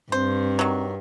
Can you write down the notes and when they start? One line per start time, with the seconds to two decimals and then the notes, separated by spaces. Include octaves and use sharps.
0.12 G2 C4 C5
0.59 D#3 F#3